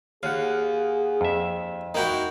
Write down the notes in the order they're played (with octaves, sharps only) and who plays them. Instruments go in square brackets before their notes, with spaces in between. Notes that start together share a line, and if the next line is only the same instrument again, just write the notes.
[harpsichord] D#2 [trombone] G#4 [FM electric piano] F5 F#5
[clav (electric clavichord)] F2 E5
[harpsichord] A#3 E4 F#4 [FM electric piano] D#4 G5